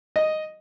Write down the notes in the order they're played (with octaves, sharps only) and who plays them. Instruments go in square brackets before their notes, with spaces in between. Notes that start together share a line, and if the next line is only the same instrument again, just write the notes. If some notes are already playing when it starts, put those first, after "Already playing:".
[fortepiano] D#5